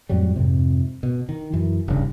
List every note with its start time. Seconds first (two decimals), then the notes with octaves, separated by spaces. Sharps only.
0.09 F2 A2 F#3 G3
0.36 F2 G#2 C3
1.03 B2
1.29 D#3
1.53 F#2 E3
1.88 D#1 A1 G2 C#3